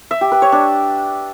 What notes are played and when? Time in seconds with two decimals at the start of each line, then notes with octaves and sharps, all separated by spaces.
0.11 E5
0.21 G4
0.32 B4
0.42 C#5
0.52 D4